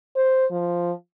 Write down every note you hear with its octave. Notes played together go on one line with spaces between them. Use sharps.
C5
F3